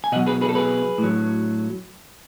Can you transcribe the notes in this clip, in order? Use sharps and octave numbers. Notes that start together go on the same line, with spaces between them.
G#5
B2 F#3 D#5 F#5
G#4 B4
G#4 B4
A4
G#4 B4
A2
F#3